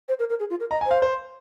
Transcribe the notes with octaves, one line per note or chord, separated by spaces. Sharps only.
C5
A#4
A#4
G#4
F4
A#4
D#5 A#5
G#5
C5 F5
C5